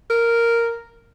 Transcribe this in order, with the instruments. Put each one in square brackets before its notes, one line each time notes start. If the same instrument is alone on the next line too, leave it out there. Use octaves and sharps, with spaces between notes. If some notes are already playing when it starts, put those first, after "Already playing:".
[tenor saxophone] A#4